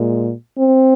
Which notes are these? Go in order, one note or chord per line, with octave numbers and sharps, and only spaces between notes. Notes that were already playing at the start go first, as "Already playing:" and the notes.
Already playing: A#2 G#3
C4